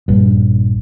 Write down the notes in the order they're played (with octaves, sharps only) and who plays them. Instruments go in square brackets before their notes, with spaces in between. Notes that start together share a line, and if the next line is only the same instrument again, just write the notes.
[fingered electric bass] A#1 G2